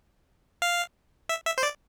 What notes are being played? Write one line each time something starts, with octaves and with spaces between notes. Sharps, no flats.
F5
E5
E5
C5
D5